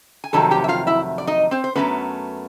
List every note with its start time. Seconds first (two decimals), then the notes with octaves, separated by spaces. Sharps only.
0.24 G#5
0.33 F2 C3 D#3 F#3 A3 A4 A5
0.51 G4 G5
0.64 E5
0.68 F4 F5
0.87 E4 E5
1.18 D5
1.27 D#4 D#5
1.51 C4 C5
1.64 C5
1.75 F#2 D#3 F#3 A3 B3 C#4 B4